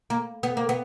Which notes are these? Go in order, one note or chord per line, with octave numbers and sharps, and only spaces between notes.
A#3
B3
A#3
B3